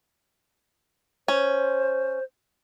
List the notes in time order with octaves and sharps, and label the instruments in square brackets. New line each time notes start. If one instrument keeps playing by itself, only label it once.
[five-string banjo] C#4 [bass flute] C5